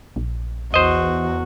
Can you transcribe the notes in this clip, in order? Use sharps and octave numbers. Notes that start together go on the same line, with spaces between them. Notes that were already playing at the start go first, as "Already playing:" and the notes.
A#1
E2 F#4 C5 D#5